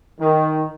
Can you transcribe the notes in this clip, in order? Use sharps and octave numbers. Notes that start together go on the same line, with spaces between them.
D#3